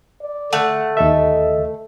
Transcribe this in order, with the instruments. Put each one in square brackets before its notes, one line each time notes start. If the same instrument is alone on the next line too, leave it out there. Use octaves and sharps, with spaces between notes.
[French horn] D5
[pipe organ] D3 [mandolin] A3 [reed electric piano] F#5 F#6
[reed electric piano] D#2 A4 E5 [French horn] D#5